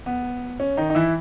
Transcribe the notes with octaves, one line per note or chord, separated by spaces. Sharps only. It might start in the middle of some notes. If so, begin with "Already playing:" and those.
B3
C#4
D#3 D#4
D#4
E3 E4